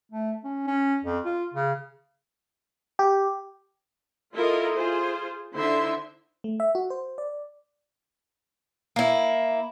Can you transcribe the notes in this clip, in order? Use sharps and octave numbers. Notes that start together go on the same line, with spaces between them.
A3
C#4
C#4
F2
F4
C#3
G4
E4 F4 A4 A#4 D#5
F4 G#4 C5
D3 D#4 E4 C5 E5 C6
A3
E5
F#4
C5
D5
A#3 E4